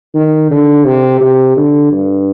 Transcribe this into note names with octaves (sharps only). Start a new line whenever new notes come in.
D#3
D3
C3
C3
D3
G2